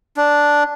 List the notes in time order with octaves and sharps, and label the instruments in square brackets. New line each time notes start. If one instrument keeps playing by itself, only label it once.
[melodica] D4